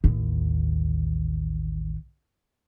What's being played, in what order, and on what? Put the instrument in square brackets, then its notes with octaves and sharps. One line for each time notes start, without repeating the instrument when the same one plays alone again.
[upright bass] A1 D#2